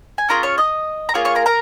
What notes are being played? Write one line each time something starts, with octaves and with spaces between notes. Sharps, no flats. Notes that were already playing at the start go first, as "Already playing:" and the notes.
G#5
C#4 F4 G#4 A#4 A#5
C#5 C#6
D#5 D#6
A#5
A#3 F4 G#4 C#5 C#6
C#5 C#6
A#4 A#5
A#4 A#5